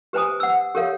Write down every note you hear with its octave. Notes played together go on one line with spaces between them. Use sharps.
G4 B4 C5 G#5 A#5 D#6
F#5 E6
G4 A4 A#4 C#5 F5